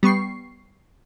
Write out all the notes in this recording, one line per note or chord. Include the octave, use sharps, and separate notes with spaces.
G3 B3 C#6 C7